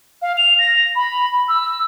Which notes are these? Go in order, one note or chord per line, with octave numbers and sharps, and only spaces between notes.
F5
F7
A#6
B5
E6